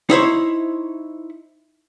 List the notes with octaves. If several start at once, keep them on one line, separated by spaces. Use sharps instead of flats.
D#4 E4 C5 C#5